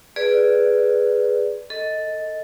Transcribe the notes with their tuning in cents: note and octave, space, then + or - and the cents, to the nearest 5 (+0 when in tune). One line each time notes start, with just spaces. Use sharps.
G#4 +0 B4 +0 D5 +0
A4 +0 D#5 +10